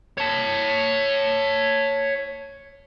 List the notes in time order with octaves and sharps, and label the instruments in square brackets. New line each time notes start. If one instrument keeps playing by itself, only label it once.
[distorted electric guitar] C#5 A5